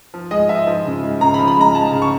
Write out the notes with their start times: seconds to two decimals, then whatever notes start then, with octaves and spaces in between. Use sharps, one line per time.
0.14 F3
0.31 G#3 D#5
0.49 F3 E5
0.67 F3
0.85 C#3
1.03 G#3
1.21 C#3 A#5
1.34 B5
1.39 F3
1.48 B5
1.57 G#3 A#5
1.75 G#3 A5
1.92 C#3
2.02 C#6